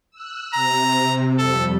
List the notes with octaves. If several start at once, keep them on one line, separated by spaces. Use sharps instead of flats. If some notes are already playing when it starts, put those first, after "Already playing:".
E6 F#6
C3 A#5
F2 G3 A4